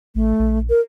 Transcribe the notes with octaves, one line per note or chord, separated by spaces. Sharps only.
A1 A3
A#1
A#4